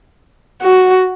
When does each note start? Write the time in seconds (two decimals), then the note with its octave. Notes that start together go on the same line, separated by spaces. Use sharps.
0.62 F#4